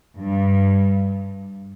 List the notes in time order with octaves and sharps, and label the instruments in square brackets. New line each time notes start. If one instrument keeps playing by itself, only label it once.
[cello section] G2